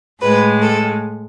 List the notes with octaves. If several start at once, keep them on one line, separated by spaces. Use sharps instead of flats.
A2 G#3 B4
A4